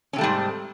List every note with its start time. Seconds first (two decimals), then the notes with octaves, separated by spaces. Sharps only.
0.13 C#4
0.16 C3
0.18 A3
0.21 G3
0.23 G#2